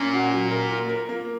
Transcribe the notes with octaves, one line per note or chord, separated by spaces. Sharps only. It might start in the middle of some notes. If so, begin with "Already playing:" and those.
Already playing: A#2 C#4
F#4
F#3
A#4
F4
A#4
A#3